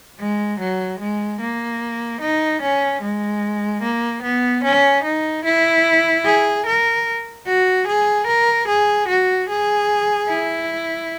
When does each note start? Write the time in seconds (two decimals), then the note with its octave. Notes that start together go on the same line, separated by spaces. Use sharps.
0.19 G#3
0.60 F#3
0.99 G#3
1.40 A#3
2.21 D#4
2.62 C#4
3.02 G#3
3.82 A#3
4.23 B3
4.64 C#4
5.04 D#4
5.45 E4
6.25 G#4
6.66 A#4
7.46 F#4
7.87 G#4
8.27 A#4
8.68 G#4
9.08 F#4
9.49 G#4
10.29 E4